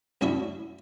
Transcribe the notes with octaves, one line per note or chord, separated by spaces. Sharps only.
C2 F#2 D4 E4 F#4 E5